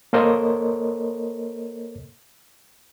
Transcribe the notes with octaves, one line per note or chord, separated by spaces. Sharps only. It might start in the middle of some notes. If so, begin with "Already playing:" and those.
A#3 A4 A#4 C5 C#5 D#5